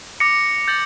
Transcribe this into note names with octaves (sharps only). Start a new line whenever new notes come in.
D6 A#6 C#7
G6 A6 F#7